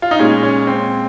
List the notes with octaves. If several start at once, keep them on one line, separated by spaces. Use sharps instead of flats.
F4
D#4
A#2 G#3 C#4
C#4
C4